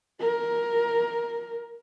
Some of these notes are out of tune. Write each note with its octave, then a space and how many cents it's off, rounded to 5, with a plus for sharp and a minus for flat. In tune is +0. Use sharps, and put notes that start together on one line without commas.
A#4 +10